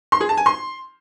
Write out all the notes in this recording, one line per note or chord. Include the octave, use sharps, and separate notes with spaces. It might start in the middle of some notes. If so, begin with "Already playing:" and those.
C6
G#4
A5
G#5
C6